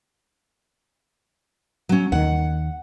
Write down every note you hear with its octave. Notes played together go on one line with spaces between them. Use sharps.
F#3 C#4
D#2 D#3 F#5